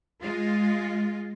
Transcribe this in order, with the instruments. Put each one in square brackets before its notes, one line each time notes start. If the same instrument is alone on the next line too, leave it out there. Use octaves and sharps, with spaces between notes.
[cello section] G#3 F4